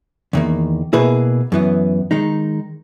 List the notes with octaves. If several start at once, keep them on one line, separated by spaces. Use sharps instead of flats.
E2 D#3 A#3
B2 A#3 E4 G#4 B4
F#2 E3 B3
D#3 G#3 D#4